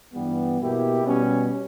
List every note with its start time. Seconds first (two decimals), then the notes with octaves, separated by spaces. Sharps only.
0.14 G2 E3 G3 B3
0.59 B2 A#3 E4 G4
1.03 B2 G3 C#4